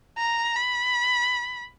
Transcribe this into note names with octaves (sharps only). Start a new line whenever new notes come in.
A#5
B5